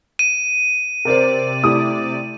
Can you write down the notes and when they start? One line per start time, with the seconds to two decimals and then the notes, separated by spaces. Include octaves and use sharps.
0.19 D#7
1.05 C3 A#4 C5 D5
1.64 A3 E4 G4 D#6